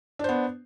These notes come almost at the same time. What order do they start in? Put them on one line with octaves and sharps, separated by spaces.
D4 C5 B3